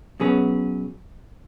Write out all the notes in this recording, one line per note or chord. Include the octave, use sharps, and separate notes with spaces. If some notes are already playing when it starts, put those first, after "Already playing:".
B2 F#3 C#4 G#4 B4